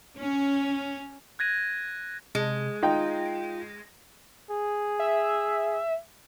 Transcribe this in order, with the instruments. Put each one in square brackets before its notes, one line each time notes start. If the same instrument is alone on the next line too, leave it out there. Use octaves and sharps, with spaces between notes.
[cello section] C#4
[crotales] F#6 G#6 A#6 D#7
[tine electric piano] C3 [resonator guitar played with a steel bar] G#3
[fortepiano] D#4 G5 [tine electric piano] F4
[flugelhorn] G#4
[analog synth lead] E5